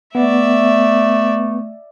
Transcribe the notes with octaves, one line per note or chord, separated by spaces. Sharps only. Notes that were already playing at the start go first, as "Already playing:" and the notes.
A3 B3 D5 E5